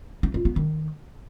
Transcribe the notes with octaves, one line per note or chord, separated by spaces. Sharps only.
D#4
F4
B3
D#3